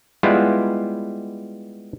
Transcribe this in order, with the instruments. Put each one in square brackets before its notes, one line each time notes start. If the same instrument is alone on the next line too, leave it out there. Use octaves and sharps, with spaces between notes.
[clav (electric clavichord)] G3 G#3 B3 E4 F4